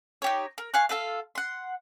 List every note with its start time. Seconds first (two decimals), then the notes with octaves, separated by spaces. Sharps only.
0.22 D#4 G4 C#5
0.58 A#4
0.74 F5 G#5 C#6 F#6
0.89 F4 A4 B4 F5
1.35 F#5 C6